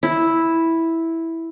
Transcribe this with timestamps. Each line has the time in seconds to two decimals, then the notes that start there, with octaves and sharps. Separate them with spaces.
0.03 E4